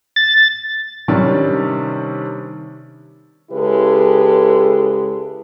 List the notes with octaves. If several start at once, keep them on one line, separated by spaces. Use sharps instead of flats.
A6
C3 D#3 G3 C#4 D4
C#3 G#3 E4 G4 A4 B4